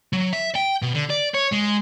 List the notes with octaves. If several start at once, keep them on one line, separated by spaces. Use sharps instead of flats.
F#3
E5
G5
B2
D3
D5
C#5
G#3